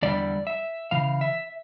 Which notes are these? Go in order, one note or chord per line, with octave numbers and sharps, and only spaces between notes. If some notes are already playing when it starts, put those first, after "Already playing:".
E2 D3 G3 D5
E5
C#3 E3 F5
E5